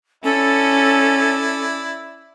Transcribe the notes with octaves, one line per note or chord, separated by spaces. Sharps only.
C#4 E4 A4 D5